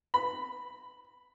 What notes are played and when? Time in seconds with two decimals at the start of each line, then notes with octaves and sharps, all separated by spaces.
0.14 B5